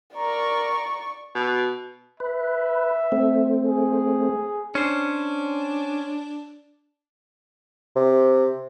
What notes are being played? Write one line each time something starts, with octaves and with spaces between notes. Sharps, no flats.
A#4 D5 A#5 C#6
B2
B4 E5
A3 C4
G#4
C#4 D4 C5
C3